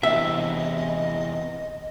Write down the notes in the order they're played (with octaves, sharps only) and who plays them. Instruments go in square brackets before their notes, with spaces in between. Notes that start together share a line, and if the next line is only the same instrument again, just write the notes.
[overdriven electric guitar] E2 C3 [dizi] D#5 [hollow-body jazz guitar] E5